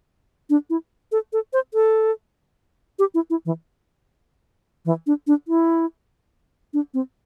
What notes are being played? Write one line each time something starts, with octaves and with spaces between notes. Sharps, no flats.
D4
E4
A4
A4
C5
A4
G4
E4
E4
E3
E3
D4
D4
E4
D4
C4